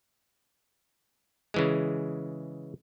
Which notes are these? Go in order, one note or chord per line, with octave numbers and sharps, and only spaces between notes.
C#3 E3 G#3